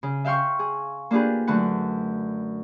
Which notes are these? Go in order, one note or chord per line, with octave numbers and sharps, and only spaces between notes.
C#3
E5 F5 G5 C6 C#6
G#4
A#3 D4 F4 G4 G#4 B4
F#2 D3 A3 B4 F#5